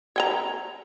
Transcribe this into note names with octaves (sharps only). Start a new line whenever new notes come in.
C#5 G5 A#5